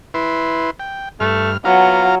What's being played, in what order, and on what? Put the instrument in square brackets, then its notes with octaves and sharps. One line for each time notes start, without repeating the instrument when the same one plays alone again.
[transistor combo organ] E4 B4 C6
G5
[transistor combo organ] G2 F6 [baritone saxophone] A3
[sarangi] F#3 [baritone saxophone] B3 [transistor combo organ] F4 F5 A#5